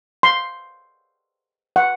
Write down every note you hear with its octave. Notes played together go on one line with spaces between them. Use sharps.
C6
F#5